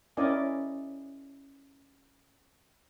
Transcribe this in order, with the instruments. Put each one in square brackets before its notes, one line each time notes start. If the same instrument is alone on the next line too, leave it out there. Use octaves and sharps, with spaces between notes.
[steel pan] C#4 E4 A#4 D5 D#5 G#5